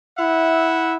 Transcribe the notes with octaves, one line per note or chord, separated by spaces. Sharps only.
E4 E5 F#5